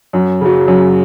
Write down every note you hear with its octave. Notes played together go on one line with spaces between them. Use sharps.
F#2
C#3 F#3
F#2